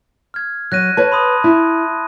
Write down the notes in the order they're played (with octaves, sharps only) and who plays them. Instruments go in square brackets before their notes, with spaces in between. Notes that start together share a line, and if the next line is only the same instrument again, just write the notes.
[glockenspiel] F6 G#6
[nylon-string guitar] F#3 [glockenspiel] F#6 A#6 D#7
[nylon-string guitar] B4 C#5 [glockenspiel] A5
[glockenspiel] B5 C6 D#6
[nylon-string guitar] E4